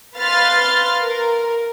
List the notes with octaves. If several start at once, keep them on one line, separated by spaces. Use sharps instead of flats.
B4 F5 C6 F6 A6
A#4